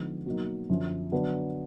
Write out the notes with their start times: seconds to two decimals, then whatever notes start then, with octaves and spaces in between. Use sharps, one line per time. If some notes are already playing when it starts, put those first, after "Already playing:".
Already playing: D3 F3 G#3 B3 D#4
0.26 B2 F#3 A#3 D#4
0.69 F#2 D3 F3
1.12 D3 F#3 B3 D4